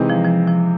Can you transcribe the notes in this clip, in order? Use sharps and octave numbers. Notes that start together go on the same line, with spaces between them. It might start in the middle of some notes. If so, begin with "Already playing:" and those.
Already playing: C3 E3 G#3 C4 D#4
F3
F3
F3